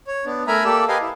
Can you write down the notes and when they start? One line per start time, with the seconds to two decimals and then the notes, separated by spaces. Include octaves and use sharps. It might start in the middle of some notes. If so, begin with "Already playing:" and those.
0.07 C#5
0.25 B3 D4
0.47 A3 A#4 E5 G#5 A#5 B5
0.65 A#3 G4 A4 D5 E6
0.88 G4 A#4 B4 D#5 F5 G#5
1.01 E4